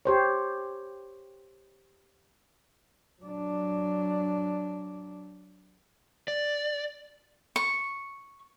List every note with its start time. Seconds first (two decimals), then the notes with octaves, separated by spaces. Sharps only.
0.05 G4 C5 C#5
3.21 F#3 D4
6.28 D5
7.56 C#6